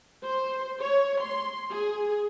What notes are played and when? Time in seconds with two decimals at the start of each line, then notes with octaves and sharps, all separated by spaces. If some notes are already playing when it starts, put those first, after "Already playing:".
0.25 C5
0.81 C#5
1.21 C6
1.70 G#4